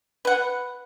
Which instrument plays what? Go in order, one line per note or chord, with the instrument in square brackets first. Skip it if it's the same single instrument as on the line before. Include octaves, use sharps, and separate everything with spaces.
[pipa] B4 F#5